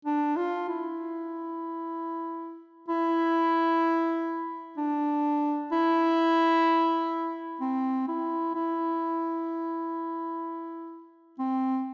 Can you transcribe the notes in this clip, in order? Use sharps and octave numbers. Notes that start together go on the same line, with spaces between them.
D4
F4
E4
E4
D4
E4
C4
E4
E4
C4